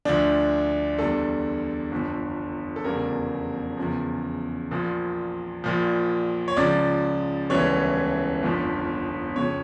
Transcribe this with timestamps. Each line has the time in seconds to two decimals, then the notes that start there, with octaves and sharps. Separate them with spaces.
0.05 D2 D3 F3 D4
0.99 E2 D3 G3 A4
1.91 G1 F2 D3
2.76 A4
2.84 F1 E2 C#3 G3 A#4
3.77 E2 C#3 F3
4.71 A#1 A#2 F3
5.64 A#1 A#2 F3
6.48 C#5
6.57 C#2 C#3 F3 D5
7.50 E1 D2 C#3 E3 G3 C#5
8.43 G1 F2 D3 F3
9.36 F2 C#3 C#5